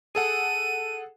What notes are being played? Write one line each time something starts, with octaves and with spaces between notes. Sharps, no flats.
G#4 A4 F#5 D#7